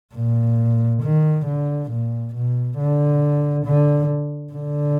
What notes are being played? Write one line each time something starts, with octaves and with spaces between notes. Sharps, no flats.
A#2
D#3
D3
A#2
B2
D3
D3
D3